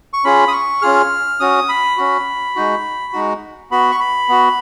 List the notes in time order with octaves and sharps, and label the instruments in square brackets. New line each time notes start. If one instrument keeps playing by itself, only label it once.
[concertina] C#6
C#4 F4 G#4 B5
D#6
C#6
C#4 F4 G#4 F6
C#4 F#4 D#6
B5
C#4 F#4
G#3 D#4 F#4
G#3 D#4 F#4
B3 F#4 B5
C#6
B5
B3 F#4